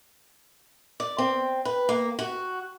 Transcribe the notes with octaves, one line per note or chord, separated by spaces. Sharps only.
D5
C4
B4
A#3
F#4